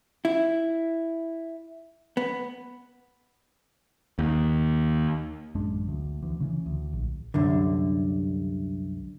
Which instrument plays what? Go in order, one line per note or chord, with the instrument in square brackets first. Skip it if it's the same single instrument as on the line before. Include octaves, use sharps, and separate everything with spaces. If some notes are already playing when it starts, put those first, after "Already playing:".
[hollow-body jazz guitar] E4
B3
[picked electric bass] D#2
A1 F#2 G#3 D4
D2
D2 E3
C#3 E3 C#4
D2
A#1
[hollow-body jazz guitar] C2 F#2 D3